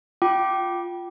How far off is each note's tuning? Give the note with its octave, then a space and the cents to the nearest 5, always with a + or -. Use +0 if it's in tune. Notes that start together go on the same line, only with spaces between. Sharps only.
F4 +0 G5 -20 D6 +0